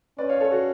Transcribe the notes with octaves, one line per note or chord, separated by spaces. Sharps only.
C#4 B4 D5
C#5 F5
A4 C#5
F#4 A4